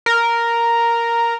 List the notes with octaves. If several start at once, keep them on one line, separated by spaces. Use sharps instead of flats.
A#4